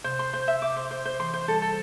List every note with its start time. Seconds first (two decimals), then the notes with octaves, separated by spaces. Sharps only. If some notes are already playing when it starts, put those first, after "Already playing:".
0.04 C3 C5
0.19 C6
0.33 C5
0.48 E5
0.62 D6
0.77 C5
0.91 C5
1.05 C5
1.19 E3 C6
1.34 C5
1.48 G3 A4
1.62 A4